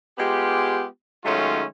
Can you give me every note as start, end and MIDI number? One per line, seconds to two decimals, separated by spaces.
0.18 0.85 56
0.18 0.85 59
0.18 0.85 65
0.18 0.85 67
1.24 1.63 51
1.24 1.63 54
1.24 1.63 56
1.24 1.63 57
1.24 1.63 61
1.24 1.63 65